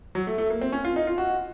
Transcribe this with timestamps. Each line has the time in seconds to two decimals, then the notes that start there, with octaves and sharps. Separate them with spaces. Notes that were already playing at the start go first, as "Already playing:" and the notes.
0.15 F#3
0.27 A3
0.38 A3
0.50 A#3
0.61 C4
0.72 C#4
0.85 F4
0.96 D#4
1.07 F4
1.18 F#4